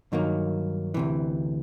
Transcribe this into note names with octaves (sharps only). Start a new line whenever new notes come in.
G2 D#3 F#3 A#3
D2 C3 E3